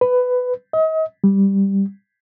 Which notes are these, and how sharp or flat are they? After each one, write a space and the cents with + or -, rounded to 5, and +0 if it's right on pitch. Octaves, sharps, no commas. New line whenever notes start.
B4 +15
D#5 +40
G3 +5